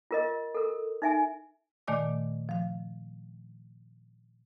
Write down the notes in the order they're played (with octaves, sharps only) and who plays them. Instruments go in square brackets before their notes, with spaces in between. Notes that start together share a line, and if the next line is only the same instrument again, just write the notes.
[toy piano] F4 A#4 D#5
A4 A#4
D#4 E5 G#5
[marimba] A#2 D#3 A3 D5 G#5 D6
F3 F5